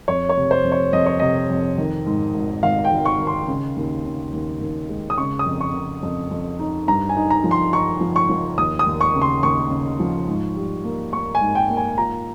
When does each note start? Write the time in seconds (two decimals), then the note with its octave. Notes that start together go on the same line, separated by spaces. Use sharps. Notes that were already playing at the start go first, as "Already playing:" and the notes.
0.08 F2 C#5
0.29 C#5
0.37 C3
0.51 C5
0.64 F2
0.72 C#5
0.93 F2 D#5
1.06 C#5
1.19 C3 D#5
1.50 F2
1.78 D#3
2.06 G#2
2.34 G#1
2.63 G#1 F5
2.85 G5
2.91 G#1
3.05 C#6
3.20 D#3
3.27 C6
3.48 C#3
3.76 D#2
4.04 C#3
4.33 D#2
4.61 D#2
4.89 G#3
5.10 D#6
5.18 C#3 C#6
5.39 D#6
5.46 F2
5.61 C#6
5.74 C#3
6.03 F2
6.31 F2
6.59 D#4
6.88 G2 A#5
7.09 G#5
7.16 D#4
7.30 A#5
7.44 F3
7.51 C6
7.73 D#4 C#6
8.01 F3
8.16 C#6
8.30 F3
8.58 D#2 D#6
8.79 D#6
8.86 D#2
9.01 C#6
9.15 C#3
9.22 C6
9.43 D#2 C#6
9.71 C#3
10.00 F3
10.28 G#2
10.56 G3
10.85 A#3
11.13 A#3 C#6
11.35 G#5
11.41 G#2
11.55 G5
11.70 A#3
11.77 G#5
11.98 F4 A#5